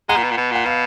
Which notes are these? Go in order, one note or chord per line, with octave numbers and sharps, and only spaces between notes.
G#3 F#5 A#5
A#2
B2
A#2
B2
A#2 F#5
B2 F5